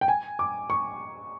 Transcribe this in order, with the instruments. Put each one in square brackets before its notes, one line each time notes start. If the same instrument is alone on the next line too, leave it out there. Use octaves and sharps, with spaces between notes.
[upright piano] G5
G#5
D6
C#6